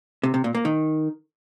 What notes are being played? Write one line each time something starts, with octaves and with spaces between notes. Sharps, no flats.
C3
C3
A#2
A#3
D#3